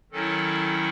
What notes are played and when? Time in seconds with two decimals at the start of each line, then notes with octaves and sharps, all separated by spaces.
0.12 D#3 F#3 C#4 E4 A4